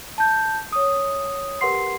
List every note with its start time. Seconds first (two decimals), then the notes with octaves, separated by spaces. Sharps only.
0.18 A5 G6
0.72 C#5 D#6
1.61 G4 A#4 B4 F#5 C6 C7